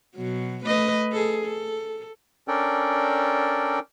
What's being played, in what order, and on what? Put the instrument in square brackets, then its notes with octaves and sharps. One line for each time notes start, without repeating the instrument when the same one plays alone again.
[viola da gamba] B2 F#3
A3 B4 D#5
G#4 A4
A4
[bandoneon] C#4 D4 A4 A#4 D5 G5